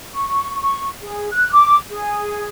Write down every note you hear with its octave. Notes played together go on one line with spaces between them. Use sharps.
C#6
C#6
G#4
F#6
D6
G#4